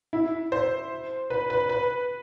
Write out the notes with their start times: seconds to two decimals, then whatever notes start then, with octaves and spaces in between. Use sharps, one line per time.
0.13 E4
0.52 C5
1.30 B4
1.50 B4
1.69 B4